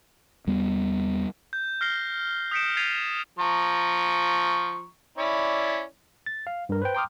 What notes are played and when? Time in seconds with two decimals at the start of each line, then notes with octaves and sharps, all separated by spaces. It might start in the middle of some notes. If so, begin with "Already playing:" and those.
0.47 E2 G3 B3
1.53 G6
1.81 F6 A#6 C7 G7
2.51 D#6 G6 B6 C#7 D7 E7
2.77 G#6 A6 B6 C7 D#7 F7
3.39 F3 A#5 C#6
5.18 C#4 E4 D5
6.26 A6
6.47 F5
6.69 G2 A#4
6.82 B4 C5 G5
6.95 G5 A#5 C6 D6 D#6 F6